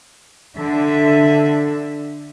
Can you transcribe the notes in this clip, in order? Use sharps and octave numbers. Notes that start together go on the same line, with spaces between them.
D3 E5